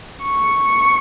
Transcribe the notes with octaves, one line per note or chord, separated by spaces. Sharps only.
C#6